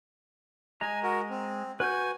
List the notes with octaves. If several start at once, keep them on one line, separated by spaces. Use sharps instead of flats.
G#3 D#5 G#5 A#5
F#4 A#4
C4
F#4 B4 G#5 G6